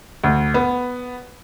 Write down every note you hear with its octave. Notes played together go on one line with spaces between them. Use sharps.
D2
B3